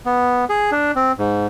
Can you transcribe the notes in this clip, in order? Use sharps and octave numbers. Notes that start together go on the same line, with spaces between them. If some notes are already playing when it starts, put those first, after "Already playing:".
B3
G#4
D4
C4
G#2